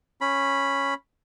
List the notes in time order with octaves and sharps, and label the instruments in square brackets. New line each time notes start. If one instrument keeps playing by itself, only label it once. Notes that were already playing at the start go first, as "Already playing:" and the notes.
[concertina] C#4 B5